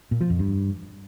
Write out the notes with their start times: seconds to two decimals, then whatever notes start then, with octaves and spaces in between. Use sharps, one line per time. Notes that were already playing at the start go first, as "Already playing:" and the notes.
0.11 A#2
0.21 F3
0.30 F2
0.39 G2